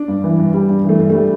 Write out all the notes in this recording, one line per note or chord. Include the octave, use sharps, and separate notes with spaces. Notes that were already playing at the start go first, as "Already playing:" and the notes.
Already playing: D4
G2
E3
G2
G3
G2
E3 A3
G2
G3 A3